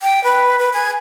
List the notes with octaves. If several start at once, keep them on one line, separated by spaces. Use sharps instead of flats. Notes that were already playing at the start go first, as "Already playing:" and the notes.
G5
B4
B4
G#5